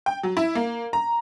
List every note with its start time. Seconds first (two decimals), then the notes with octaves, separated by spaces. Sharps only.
0.06 G5
0.23 F#3
0.37 E4
0.55 A#3
0.93 A#5